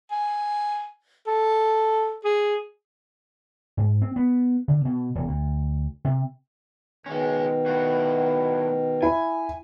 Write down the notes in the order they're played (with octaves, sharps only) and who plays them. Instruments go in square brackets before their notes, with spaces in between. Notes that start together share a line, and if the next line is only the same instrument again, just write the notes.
[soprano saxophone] G#5
A4
G#4
[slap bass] G#2
C4
B3
D3
B2
E1
D2
C3
[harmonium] B2 D#3 [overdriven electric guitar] G#3 C#4
[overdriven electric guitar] A2 F#4
[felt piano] E4 [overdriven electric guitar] G#5